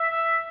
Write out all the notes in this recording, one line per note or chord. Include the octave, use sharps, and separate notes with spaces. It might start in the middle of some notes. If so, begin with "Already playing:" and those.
Already playing: E5